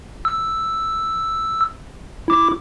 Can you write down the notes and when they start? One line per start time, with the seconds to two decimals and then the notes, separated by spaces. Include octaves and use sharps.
0.25 E6
2.28 E4 D6